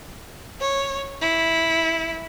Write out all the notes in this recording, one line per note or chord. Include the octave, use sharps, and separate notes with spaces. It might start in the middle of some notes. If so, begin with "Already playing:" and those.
C#5
E4